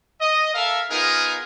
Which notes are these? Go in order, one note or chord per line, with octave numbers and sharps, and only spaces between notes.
D#5
A4 A#4 E5 F5
B3 D#4 F4 G#4 A#4